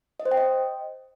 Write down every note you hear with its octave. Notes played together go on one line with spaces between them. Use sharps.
D#5
C5
G5
D#5